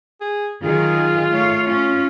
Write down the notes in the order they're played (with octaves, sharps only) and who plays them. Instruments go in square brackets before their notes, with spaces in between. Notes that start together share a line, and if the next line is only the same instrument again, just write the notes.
[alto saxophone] G#4
[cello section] D#3 F#3 G#4 [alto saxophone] F4
[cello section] A3 C#5 F5
[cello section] C#4 [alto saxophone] F4